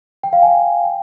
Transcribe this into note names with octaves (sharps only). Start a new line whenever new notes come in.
G5
F5
G#5
G5